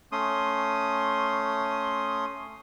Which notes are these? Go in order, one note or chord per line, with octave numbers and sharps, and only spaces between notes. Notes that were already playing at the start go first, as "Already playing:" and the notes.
A3 C#4 C6 D#6